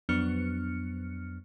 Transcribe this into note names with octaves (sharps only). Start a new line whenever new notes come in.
F2 F#3 B3 D4 F6 C#7